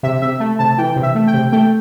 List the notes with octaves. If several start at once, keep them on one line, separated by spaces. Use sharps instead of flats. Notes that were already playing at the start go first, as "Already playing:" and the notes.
C3 E5
C3 E5
A3
C3 A5
E3 G5
C3
E5
A3
G5
C3
A3 G5